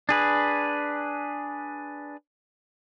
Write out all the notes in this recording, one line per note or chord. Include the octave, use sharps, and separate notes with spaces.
D4 G#4 B4